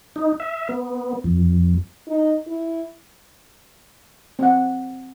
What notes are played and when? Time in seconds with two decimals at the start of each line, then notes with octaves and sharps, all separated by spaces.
0.16 D#4
0.40 E5
0.69 B3
1.24 F2
2.08 D#4
2.47 E4
4.39 C4 F#5